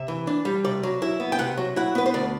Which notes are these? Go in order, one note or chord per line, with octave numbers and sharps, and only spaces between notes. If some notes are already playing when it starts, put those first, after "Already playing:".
Already playing: C3 E5
E3
D4
G3
C3 D5
F#3
E4 E5
B3
G5
C3 F#5
F#3
E4 F#5
B3 B4
C5
D2 D5